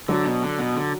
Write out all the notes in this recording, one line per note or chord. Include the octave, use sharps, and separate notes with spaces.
D3 F#3 D4 F#4
B2
D3
B2
D3